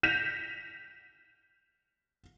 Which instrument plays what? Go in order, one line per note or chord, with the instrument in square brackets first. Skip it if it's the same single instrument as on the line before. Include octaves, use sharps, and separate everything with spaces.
[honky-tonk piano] G6 A#6 B6 C#7 E7 F7